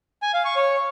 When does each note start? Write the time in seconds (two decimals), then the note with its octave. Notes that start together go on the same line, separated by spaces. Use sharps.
0.22 G#5
0.34 F5
0.45 C#6
0.56 C#5